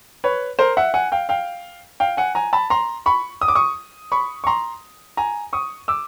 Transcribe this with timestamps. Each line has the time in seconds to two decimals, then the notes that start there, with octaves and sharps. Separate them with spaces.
0.24 B4 C#5
0.59 A#4 C5
0.77 E5 F#5
0.94 F#5 G#5
1.12 F5 G5
1.29 F5 G5
2.00 F5 G5
2.17 F#5 G#5
2.35 G#5 A#5
2.53 A5 B5
2.70 A#5 C6
3.06 B5 C#6
3.41 D#6
3.48 D6
3.55 C#6 D#6
4.12 B5 C#6
4.44 C#6
4.47 A#5 C6
5.17 G#5 A#5
5.53 C#6 D#6
5.88 D6 E6